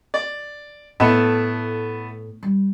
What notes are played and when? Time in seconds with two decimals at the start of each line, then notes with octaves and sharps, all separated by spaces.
0.14 D5
1.00 A2 A3 B3 E4
2.43 G3